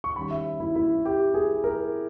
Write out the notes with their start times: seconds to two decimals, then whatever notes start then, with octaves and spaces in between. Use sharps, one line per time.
0.04 C#6
0.16 D#3 G3 C#4 B5
0.31 E5
0.60 E4
0.76 E4
1.05 G4
1.34 G#4
1.64 A#4